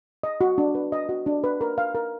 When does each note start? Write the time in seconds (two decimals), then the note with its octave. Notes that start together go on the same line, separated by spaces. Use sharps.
0.23 D#5
0.41 F#4
0.58 D4
0.75 B4
0.92 D#5
1.09 F#4
1.26 D4
1.44 B4
1.61 A#4
1.78 F5
1.95 A#4